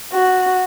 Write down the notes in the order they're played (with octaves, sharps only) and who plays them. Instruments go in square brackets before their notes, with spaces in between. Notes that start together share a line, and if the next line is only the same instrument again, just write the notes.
[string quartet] F#4